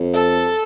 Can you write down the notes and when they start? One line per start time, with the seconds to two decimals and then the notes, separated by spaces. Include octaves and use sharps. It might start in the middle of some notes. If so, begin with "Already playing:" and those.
Already playing: F2
0.14 A4